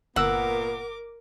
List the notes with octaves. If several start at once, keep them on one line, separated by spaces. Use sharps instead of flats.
G1 A#2 B3 A#4 F#5 D6 E6